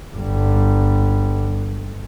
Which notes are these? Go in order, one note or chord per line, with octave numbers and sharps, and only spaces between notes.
G1 G3